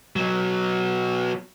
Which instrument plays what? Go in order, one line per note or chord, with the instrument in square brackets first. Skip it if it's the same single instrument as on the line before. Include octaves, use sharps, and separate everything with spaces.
[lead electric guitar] B2 F#3